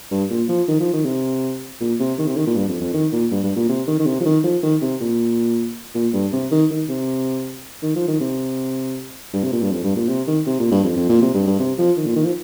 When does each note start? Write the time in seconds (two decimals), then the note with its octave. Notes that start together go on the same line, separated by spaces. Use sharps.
0.11 G2
0.30 A#2
0.48 F3
0.68 D#3
0.80 F3
0.93 D#3
1.05 C3
1.80 A#2
2.00 C3
2.18 D#3
2.27 C3
2.37 D#3
2.46 A#2
2.56 G2
2.69 F2
2.81 F2
2.93 D#3
3.12 A#2
3.31 G2
3.43 G2
3.56 A#2
3.69 C3
3.87 D#3
3.99 D#3
4.06 C3
4.20 F3
4.25 D#3
4.44 F3
4.63 D#3
4.82 C3
5.01 A#2
5.94 A#2
6.13 G2
6.33 C3
6.51 D#3
6.70 D#3
6.89 C3
7.82 D#3
7.95 F3
8.08 D#3
8.21 C3
9.33 G2
9.43 C3
9.52 A#2
9.62 G2
9.71 F2
9.83 G2
9.96 A#2
10.08 C3
10.27 D#3
10.46 C3
10.59 A#2
10.71 G2
10.83 F2
10.96 F2
11.09 A#2
11.22 C3
11.34 G2
11.46 G2
11.59 C3
11.78 F3
11.97 D#3
12.06 A#2
12.16 D#3
12.25 F3